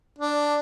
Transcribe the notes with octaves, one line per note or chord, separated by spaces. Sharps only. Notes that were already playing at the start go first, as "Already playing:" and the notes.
D4